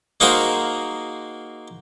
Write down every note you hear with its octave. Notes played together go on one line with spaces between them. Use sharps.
A#3 D#4 F#4 G#4 A#4 C5